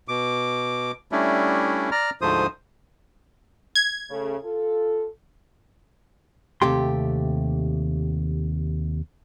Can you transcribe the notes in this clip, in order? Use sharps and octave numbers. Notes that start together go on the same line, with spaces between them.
B2 D6
G3 A3 C#4 D4 E4
D5 A#5 F6
D2 G#2 F3 A3 C5 D#6
G#6
C#3 A3
F4 A4
D#2 C3 A3 G4 C6